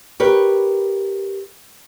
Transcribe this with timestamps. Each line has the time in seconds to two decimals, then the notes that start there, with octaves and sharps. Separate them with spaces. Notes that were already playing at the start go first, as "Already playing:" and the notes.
0.20 G4 A#4 B4 C#5